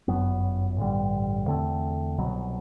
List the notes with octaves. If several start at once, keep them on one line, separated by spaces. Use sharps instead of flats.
G1 F#2 F#3 B3
A1 G2 D3 G3
E2 D3 A3 C4
C2 B2 F#3